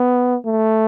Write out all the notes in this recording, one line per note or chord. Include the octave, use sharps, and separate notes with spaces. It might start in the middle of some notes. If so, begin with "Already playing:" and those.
Already playing: B3
A3